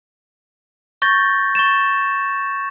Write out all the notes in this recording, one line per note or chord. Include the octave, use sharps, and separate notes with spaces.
C#6 G6 A6 A#6
C#6 A6 E7